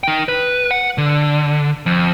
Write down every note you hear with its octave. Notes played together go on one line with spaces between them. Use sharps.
D#4 G5
B4
F#5
D3
F2